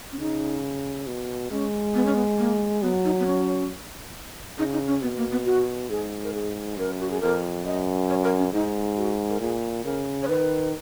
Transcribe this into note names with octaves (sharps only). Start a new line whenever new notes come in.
C#4
C#3 D#4
B2
G#3 C#4
B3
C#4
B3
A#3
F#3 B3
D#4
B3
C#4
C#3 D#4
D#4
C#4
B2 B3
A#3
B3
F#4
G#2 G#4
A#4
G#4
F#2 A#4
F#4
G#4
F2 A#4
F#2 D#5
C#5
A#4
C#4
G#2 D#4
F#4
A#4
A#2 G#4
C#3 A#4
C#5
D#3 B4